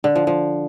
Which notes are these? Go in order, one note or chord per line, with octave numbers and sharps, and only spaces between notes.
D3
F3
F3